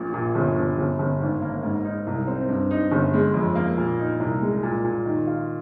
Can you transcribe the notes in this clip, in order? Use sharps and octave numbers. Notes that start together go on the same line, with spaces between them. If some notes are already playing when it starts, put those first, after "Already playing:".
Already playing: A#1 A#2
A#2
G1
G1
G1
G1
G#1
A#3
G#2
D#4
C2
C4
G2
D#4
G1
G#3
F2
A#3
A#2
D#4
C2
G#3
A#2
A#2
D#3
F4